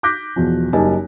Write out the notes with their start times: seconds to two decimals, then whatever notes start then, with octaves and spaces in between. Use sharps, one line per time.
0.03 D6 F#6 G6 A#6 B6
0.36 E2 B2 F3
0.73 F#1 G3 D#4 G#5 A5